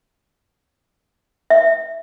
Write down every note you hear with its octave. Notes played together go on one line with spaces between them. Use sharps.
E5